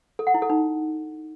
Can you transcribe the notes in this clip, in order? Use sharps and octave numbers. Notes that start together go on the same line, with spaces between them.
A4
F#5
E4
A4
D#4